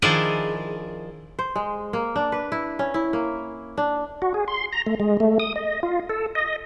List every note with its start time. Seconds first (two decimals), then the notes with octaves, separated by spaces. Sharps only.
0.02 D#3 F3 D4 E4 F4 G#4
1.39 C5
1.56 G#3
1.93 A#3
2.16 D4
2.32 B4
2.52 E4
2.79 C#4
2.94 E4
3.13 A#3
3.77 D4
4.22 F#4
4.34 G#4
4.48 C6
4.73 A#5
4.86 A3
5.00 G#3
5.20 A3
5.40 D#6
5.56 D#5
5.83 F4
6.09 A4
6.35 D#5